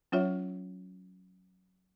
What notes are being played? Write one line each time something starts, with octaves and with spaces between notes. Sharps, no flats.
F#3 C#4 F4 C#5 E5